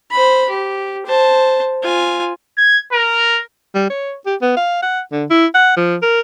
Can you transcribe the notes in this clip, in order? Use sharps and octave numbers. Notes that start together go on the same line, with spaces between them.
C5 B5
G4
C5 A5
F4 G#5
G#6
A#4
G3
C#5
G4
B3
F5
F#5
D3
E4
F#5
F3
A#4